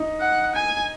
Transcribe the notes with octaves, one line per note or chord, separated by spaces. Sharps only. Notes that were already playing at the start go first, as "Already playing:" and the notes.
Already playing: D#4
F#5
G#5